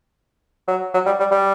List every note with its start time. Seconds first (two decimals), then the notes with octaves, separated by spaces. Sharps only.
0.68 F#3
0.94 F#3
1.06 G3
1.20 G3
1.31 G3